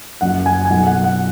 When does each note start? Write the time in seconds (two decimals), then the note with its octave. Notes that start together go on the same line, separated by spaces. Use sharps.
0.21 F#1 F#2 F#3 F#5
0.46 G#5
0.65 G#5
0.70 B1 B2 F#3 F#5
0.87 F#5
1.04 F#5